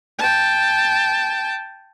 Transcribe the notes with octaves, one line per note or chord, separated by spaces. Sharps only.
G5 A5